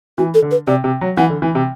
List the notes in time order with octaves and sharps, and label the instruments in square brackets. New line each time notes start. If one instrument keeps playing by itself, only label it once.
[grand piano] E3 [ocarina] F#4
[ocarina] A4
[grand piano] D3
[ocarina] B4
[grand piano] C3 [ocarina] D5
[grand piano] C3
F#3
[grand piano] E3 [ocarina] F#5
[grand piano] D3
E3
C3